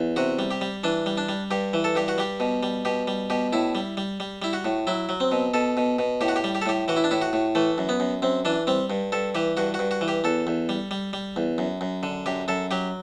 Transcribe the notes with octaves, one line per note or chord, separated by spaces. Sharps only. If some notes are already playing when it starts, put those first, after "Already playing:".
Already playing: E2
C3 F#4
G3
G4
G3
E3 D4
G3
D4
G3
G2 G4
E3
A4
G2 G4
F#4
G3 G4
B2
G3
B2 G4
G3
B2 G4
A2 E4
G3
G3
G3
G3 E4
F#4
A2
F#3 E4
F#3
C4
B2
B2 A4
B2
B2
A2 G4
F#4
G4
G3
G4
A4
A2 G4
E3 F#4
E4
D4
A2 E4
F#4
A2
E3 A3
F#2
B3
F#2
F#2 C4
E3 D4
G3 C4
G2
G2 A4
E3 G4
G2 F#4
F#4
G2
F#4
E3
G4
E2 A4
E2
G3
G3
G3
E2
F#2
F#2
D3
F#2 G4
F#2 A4
F#3 G4